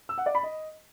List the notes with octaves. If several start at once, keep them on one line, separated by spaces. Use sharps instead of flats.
E6
F#5
D5
B5
D#5